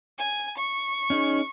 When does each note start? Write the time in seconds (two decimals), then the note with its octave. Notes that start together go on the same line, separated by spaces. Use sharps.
0.19 G#5
0.58 C#6
1.10 C#4 D#4 G#4